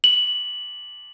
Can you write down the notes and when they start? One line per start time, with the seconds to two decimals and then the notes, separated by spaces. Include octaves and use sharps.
0.04 F#7